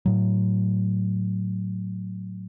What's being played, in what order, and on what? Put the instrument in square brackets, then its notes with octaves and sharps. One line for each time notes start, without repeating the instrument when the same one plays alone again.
[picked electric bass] A2 F#3